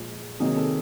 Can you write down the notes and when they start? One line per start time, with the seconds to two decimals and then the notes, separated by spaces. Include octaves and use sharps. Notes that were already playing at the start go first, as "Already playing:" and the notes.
Already playing: A#2 F3 G#3
0.40 C3 D#3 F#3 A#3 D#4 G#4
0.56 A4